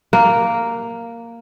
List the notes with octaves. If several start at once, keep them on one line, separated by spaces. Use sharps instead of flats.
A#3